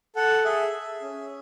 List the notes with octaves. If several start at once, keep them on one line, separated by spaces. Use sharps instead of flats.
A4 F#5
G#4 E5
G#4
C#4